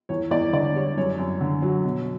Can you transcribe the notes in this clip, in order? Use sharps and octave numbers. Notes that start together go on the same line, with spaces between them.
E2 C#5
E2 D5
D3 D5
G3 C#5
F#2 C#5
F#2
D3
F#3
B2